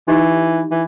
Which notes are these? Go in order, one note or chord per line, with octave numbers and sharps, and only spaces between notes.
E3 D#4 G4 D#5
E3